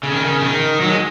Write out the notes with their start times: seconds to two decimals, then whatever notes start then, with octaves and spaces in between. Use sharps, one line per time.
0.03 C#3
0.13 D#3
0.23 C#3
0.42 D#3
0.80 F#3
0.88 G#3